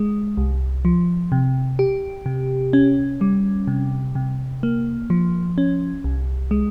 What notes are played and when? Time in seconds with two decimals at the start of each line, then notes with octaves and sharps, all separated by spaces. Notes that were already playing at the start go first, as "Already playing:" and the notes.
Already playing: G#3
0.37 C2
0.85 F3
1.32 C3
1.79 G4
2.26 C3
2.73 C#4
3.21 G3
3.67 C3
4.15 C3
4.63 A#3
5.10 F3
5.58 C#4
6.04 C2
6.51 G#3